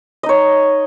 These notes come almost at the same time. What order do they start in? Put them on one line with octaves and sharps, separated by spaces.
D#5 D#4 C#5